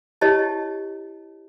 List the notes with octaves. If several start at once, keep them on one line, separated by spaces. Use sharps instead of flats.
E4 G4 C#5 D#5 A5